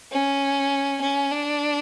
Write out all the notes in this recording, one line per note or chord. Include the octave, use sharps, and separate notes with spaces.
C#4
C#4
D4